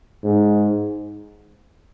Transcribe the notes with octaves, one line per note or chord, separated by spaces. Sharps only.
G#2